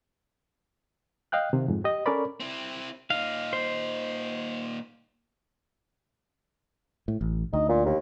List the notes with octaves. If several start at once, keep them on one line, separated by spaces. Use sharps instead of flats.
D#5 F5 G5 F#6
C3 D#3
F2 G#2
G4 D#5
C#4 A4 A#4 C#5 D5 B5
C4 E4
A#2 D#4 F5
C5
A2
A1
D2 D#4
A#2
D#2